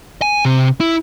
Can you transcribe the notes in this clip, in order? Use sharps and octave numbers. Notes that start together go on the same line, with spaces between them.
G#5
C3
E4